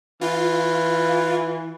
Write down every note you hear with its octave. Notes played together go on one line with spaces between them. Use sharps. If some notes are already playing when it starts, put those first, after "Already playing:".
E3 F4